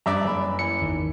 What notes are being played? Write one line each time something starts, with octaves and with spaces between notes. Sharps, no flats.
G2 D5 E5 A#5
F#1 B5
E3 C#7
G#1 E2 D#3